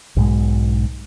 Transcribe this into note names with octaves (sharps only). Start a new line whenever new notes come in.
B1 G#2 B2 G#3